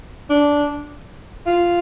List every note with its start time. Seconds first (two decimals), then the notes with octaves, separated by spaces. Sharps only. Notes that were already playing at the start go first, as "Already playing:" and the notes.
0.30 D4
1.46 F4